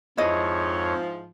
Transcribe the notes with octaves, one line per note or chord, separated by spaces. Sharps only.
F2 G#2 F3 E4 C#5 D#5